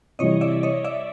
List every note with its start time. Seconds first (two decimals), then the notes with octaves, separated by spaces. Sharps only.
0.19 C3 E3 G3 C#5 D#5
0.41 D5 E5
0.63 C#5 D#5
0.84 D5 E5